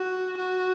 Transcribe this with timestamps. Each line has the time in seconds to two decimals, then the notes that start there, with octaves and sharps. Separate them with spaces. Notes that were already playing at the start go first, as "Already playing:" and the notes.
Already playing: F#4
0.37 F#4